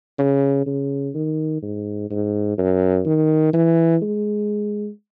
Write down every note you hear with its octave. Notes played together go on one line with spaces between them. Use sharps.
C#3
C#3
D#3
G#2
G#2
F#2
D#3
E3
G#3